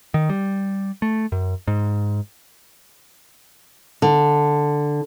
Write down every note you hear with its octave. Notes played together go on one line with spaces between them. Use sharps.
D#3
G3
A3
F#2
G#2
D3